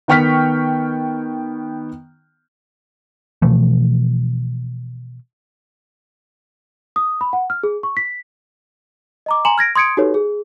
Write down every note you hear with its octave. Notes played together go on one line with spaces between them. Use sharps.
D#3 B3 G5 C#6 F6 B6
B2 E3 F3 A3
D#6
B5
F#5
F6
G#4
C#6
B6
D#5 A#5 D6
G#5 A#5 C6 E7 F#7
F6 G#6 A#6 D7
C6 D#6 G#6 C#7 D7
D#4 F#4 G4 A4 B4 C#5
G#4